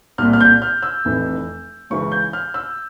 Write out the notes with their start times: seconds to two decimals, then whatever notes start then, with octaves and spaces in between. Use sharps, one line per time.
0.18 C2 A#2 F6
0.33 F6
0.40 G6
0.62 F6
0.83 E6
1.05 F1 F2 E3
1.90 C#2 C#3 E3 C#6
2.12 G6
2.33 F6
2.54 E6